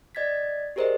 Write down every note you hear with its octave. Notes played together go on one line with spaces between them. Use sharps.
D5 D#5 G#6 A6 B6
G4 G#4 A#4 C5 D5 D#5